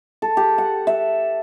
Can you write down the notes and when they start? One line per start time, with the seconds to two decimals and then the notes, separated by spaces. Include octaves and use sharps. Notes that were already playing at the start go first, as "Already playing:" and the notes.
0.22 A4
0.37 G4
0.58 F#5
0.87 E5